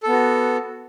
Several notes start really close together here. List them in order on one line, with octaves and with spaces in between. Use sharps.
A4 B3 F#4